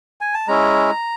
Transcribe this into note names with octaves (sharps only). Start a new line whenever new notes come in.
G#5
A5
G#3 C#4 E4 A#5